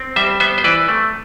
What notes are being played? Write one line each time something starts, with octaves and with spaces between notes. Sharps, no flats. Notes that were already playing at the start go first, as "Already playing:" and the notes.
Already playing: C4
G3 C5 E5
B3 C5 E5
C5
E3 B4 D5
A3